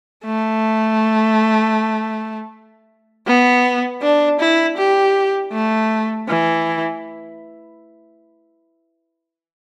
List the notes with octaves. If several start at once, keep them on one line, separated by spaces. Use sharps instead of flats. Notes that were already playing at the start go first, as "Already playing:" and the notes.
A3
B3
D4
E4
G4
A3
E3